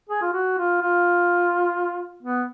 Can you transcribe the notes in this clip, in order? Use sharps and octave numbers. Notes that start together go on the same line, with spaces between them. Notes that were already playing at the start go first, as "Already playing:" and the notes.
G#4
F4
F#4
F4
F4
B3